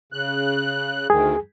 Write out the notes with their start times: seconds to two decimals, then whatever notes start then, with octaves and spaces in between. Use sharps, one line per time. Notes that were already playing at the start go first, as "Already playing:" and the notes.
0.12 C#3 F#6
1.10 D2 D#3 G#4